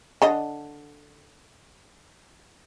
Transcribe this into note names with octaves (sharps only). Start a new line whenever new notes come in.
D3 D4 D#5